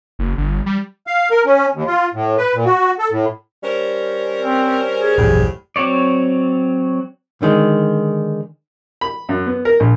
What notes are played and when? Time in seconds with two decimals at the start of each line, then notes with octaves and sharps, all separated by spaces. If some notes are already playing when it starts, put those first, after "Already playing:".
0.19 F#1
0.38 G1
0.66 G3
1.07 F5
1.31 A#4
1.46 C#4
1.74 D#2
1.87 F4
2.14 A2
2.38 B4
2.54 A#2
2.66 F#4
2.99 A4
3.12 A2
3.63 G3 C#4 A#4 C5
4.41 C4
4.98 G#4
5.18 D#1 A1 F#2 A2 F3 G4
5.76 F#3 C4 F#4 C#5 D5
7.42 D3 D#3 G#3
9.01 B5
9.29 F#2
9.46 B3
9.65 A#4
9.80 A#1